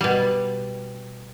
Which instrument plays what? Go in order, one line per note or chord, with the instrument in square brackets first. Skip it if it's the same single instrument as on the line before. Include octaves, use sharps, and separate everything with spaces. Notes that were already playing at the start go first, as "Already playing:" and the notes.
[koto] B2 G3